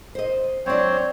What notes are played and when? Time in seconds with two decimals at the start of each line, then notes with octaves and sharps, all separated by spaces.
0.15 C5 D#5
0.66 F#3 C4 D4 C5 C#5